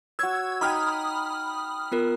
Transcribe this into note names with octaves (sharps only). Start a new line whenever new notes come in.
F#4 C#5 E6 G#6
D#4 G5 B5 D#6 F6
B3 F4 A#4